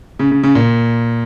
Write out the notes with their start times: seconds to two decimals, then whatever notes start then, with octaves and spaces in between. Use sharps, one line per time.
0.19 C#3
0.31 C#3
0.43 C#3
0.55 A#2